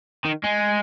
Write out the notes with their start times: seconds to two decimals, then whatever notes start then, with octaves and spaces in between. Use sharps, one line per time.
0.25 D#3
0.44 G#3